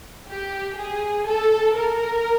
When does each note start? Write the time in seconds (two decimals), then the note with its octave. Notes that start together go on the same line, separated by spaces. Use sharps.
0.28 G4
0.76 G#4
1.26 A4
1.75 A#4